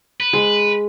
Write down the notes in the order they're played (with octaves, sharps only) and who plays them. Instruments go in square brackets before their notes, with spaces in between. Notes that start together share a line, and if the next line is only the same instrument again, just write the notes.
[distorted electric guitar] B4
[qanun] G#3